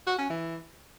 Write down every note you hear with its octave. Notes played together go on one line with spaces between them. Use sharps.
F#4
C#4
E3